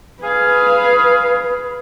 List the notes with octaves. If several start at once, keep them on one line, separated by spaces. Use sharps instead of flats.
G#4 B4 F5